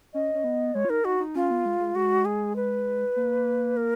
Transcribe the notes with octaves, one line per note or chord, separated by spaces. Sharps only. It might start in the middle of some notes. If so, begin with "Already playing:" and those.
C#4 D#5
C#4
B3
G#3 C#5
F4
D#4 A#4
D#4 F#4
D#4
C#4 F4
B3
G#3
G#3
G#3 F#4
G#4
B4
A#3
A#4